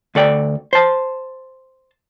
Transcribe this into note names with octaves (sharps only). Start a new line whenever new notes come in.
D2 A4 D5 G5
C5 A5